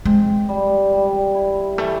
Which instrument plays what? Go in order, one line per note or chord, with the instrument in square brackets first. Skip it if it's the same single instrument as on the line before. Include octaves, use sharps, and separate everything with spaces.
[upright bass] G#3 [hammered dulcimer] C4
[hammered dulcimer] G3
G3
E4
[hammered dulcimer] E3 [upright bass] A3